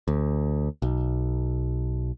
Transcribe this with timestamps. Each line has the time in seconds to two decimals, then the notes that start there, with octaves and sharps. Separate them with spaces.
0.08 D2
0.82 B1